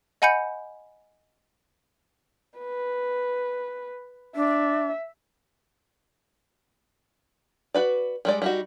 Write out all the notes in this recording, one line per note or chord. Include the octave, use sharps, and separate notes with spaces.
D#5 F#5 G#5 B5 G6 C#7
B4
D4 E5
F#4 B4 D5
G3 G#3 D5
G3 D#4 F#4